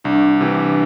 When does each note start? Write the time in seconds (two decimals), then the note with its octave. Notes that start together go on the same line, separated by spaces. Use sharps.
0.04 C2 D4
0.41 C3 E3